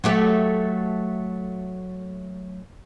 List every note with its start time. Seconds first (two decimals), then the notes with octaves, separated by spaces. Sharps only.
0.04 F#3 A3 G4